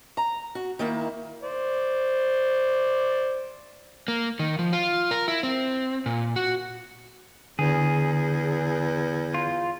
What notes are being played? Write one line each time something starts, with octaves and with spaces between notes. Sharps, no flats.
A#5
F#4
D#3 A#3 E4
C5 D5
A#3
D#3
F3
F4
A#4
E4
C4
A#2
F#4
E2 D3 G#4
F4